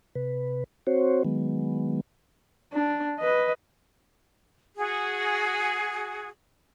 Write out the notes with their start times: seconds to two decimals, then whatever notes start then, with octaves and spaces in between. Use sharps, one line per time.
0.15 C3 B4
0.87 C4 F#4 C5 C#5
1.25 D#3 F#3 G#3 B3
2.73 D4
3.20 B4 D#5
4.76 F#4 G#4